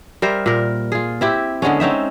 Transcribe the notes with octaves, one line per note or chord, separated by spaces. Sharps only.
G3 A#4 C5 E5
A#2 A#4
F4 G#4
C4 E4 G4
D3 G#3 B3 C#4
C4 C#4 D#4 E5